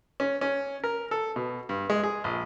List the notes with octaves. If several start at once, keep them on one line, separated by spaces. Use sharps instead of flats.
C#4
C#4
A#4
A4
B2
G2
G#3
G#4
A#1